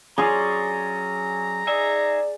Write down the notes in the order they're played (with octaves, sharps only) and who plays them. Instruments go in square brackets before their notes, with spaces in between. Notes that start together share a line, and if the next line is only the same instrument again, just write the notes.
[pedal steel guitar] F#3 C#4 D5 [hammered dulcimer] G#4 C6 C#6 [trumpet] A#5
[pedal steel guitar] D#4 G#4 E5 [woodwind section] D5